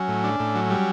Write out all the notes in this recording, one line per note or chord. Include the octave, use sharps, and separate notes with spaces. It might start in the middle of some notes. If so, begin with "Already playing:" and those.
Already playing: F#3 C#4
A2
D4
A2
F#3
G3